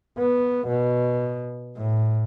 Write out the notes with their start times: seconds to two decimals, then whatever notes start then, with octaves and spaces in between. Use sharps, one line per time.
0.18 B3
0.67 B2
1.77 A2